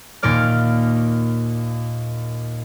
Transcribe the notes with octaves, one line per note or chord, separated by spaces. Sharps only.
D#2 A#2 A#3 D5 F6